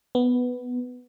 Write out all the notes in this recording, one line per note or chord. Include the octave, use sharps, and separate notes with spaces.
B3